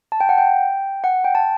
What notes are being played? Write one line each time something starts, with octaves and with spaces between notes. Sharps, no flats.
A5
G5
F#5
G5
F#5
G5
A5